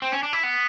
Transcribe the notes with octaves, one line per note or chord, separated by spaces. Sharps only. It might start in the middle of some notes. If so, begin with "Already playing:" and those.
C4
C#4
D4
E4
B3